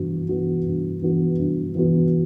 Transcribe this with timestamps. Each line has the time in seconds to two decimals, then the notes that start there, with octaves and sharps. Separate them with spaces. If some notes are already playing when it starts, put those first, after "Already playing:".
Already playing: G2 E3 B3 F#4
0.29 E3 B3 F#4
0.66 G2
1.02 E3 B3 F#4
1.39 G2
1.75 E3 B3 F#4